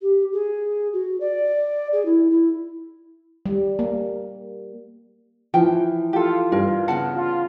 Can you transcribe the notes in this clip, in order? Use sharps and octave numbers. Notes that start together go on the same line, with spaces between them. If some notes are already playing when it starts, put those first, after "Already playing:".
G4
G#4
F#4
D5
G#4
E4
E4
G3
A#3
E3 F3 G5
F4 G4 A4
G2 A#4
C#3 B3 A#4 F#5 A5
F4